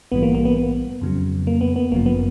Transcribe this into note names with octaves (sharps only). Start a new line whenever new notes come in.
A#1 G#2 E3 G3 B3
A#3
A#3
B3
B3
F2 C#3 F#3
A#3
B3
B3
G1 F#2 C#3 F3 A#3
B3